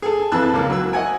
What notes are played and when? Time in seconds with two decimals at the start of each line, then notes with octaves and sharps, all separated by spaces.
0.02 G#4 A4
0.32 F2 E3 A5 E6 F#6
0.53 C#2 A#3
0.70 F#3 E6
0.93 D#5 F#5 G#5